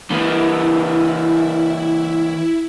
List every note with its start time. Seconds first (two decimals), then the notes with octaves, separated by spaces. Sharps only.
0.11 E3 A#3 E4